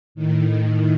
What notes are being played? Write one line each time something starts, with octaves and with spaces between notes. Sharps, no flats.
A2 D#3